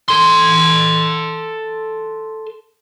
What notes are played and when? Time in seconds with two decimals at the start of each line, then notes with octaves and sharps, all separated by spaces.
0.09 A4 C6